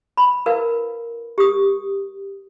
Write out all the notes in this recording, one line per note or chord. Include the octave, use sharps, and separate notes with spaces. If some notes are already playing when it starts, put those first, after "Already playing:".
B5
E4 A#4 B4 F5
G4 D#6